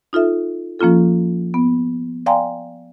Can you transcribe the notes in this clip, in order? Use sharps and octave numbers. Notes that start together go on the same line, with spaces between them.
D#4 F4 A4 E5
F3 A#3 C#4 F4 A4
B3
D5 F5 G5 G#5 A#5 C6